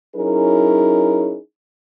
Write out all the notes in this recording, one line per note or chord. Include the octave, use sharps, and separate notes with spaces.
F#3 C#4 D#4 E4 G#4 A#4